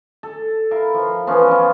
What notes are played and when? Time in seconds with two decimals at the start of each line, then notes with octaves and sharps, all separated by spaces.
0.23 A4
0.71 E4 A#4 F5
0.94 F3
1.27 E3 F3 B3 C#4
1.48 C#4 D5